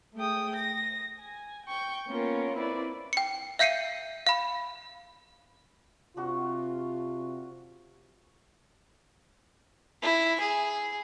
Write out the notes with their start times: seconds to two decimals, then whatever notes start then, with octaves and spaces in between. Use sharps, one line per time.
0.16 A3 G#4 G5 D#6
0.55 A#6
1.19 G#5
1.66 G5 C#6 G6
2.08 A#3 B3 C#4 F4 A#4
2.56 C4 E4 B4 D5
3.13 G5 C#7
3.59 E5 F5 G6 C7 C#7 D#7
4.27 F5 B5
6.17 C3 D4 F4 F#4 C#6
10.02 E4
10.40 G#4